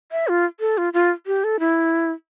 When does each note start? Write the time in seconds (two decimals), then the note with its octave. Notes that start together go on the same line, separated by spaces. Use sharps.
0.12 E5
0.28 F4
0.60 A4
0.78 F4
0.93 F4
1.27 G4
1.44 A4
1.60 E4